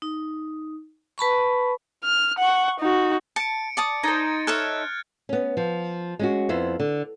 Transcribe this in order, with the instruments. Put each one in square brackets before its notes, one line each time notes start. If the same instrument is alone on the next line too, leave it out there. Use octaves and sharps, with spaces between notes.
[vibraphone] D#4
B4 A5 B5 C#6
[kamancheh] F6
F#5 C#6
D#4 F#4
[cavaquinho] A5 [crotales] C#7 D7
[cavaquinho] D5 A5 D#6
[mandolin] D#4 C5 [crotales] G#6 A6
[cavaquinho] A4 C#5 E5 [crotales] F6 F#6 G#6
[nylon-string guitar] B3 C#4
F3
G#3 C#4 F#4
F2 B3 E4 C5
D3